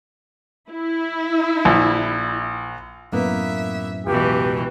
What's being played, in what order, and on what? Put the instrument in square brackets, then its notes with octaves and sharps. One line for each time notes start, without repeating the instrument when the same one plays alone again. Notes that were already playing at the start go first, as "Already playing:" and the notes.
[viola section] E4
[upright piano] A#1
[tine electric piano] F#2 A2 [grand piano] A#3 B3 [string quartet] E5
[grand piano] C#2 [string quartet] B2 E3 [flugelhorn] G4